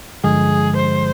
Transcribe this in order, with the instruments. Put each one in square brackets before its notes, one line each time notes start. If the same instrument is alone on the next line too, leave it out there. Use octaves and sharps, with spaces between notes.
[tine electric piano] G2 D3 F3 G#3 [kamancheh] G#4
[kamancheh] C5